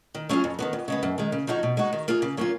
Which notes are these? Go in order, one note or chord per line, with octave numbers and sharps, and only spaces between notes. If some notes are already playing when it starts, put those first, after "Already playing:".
D#3
F#3 C#4 F4 G#4
F2
D#3 F#3 B3
F2
C#3 G#3 B3
F#2
D#3 G#3
C#3
F3 G#3 D#4 F#4
B2
G#3 D#4 F#4
D#3
A#3 F4 G#4
C#3
F#3 A#3 C#4 F4